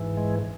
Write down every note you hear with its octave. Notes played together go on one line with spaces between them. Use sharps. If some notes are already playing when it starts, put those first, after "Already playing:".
Already playing: G#2 E3
G#3